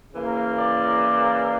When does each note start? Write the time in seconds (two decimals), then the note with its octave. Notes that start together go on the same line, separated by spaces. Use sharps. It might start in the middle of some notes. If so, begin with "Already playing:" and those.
0.13 C#3 E3 A#3
0.57 D5